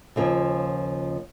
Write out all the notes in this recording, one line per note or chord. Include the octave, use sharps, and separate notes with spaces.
D#2 C#3 F3 A#3 F4